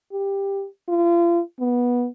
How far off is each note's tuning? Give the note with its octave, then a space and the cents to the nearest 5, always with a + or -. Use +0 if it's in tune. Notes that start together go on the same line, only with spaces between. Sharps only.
G4 +10
F4 -35
B3 -15